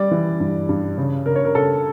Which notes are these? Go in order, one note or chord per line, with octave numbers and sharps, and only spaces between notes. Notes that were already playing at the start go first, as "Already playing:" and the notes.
Already playing: G3 D5
E3
G2
G2
C#3
C#3 A#4
C#5
A#4
C#3 A4